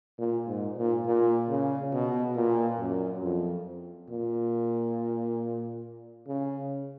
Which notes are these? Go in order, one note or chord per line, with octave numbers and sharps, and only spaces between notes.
A#2
G#2
A#2
A#2
C#3
B2
A#2
F#2
F2
A#2
C#3